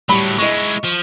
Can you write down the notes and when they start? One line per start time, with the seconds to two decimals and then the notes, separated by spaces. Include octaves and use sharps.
0.09 A2 F#3 G3 B5
0.38 G#3 E4 D#5 C#6
0.84 F3